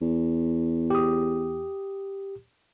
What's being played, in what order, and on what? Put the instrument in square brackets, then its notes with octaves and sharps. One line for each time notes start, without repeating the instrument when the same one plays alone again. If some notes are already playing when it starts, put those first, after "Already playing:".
[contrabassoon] E2
[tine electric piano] G4 D#6